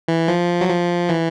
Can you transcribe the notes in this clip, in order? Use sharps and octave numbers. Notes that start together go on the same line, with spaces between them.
E3
F3
F#3
F3
E3